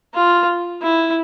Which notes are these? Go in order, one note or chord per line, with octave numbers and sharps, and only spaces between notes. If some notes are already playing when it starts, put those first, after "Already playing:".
F4
E4